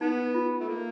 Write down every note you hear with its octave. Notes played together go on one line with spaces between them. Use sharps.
B3 D#4
F4
A3
A#3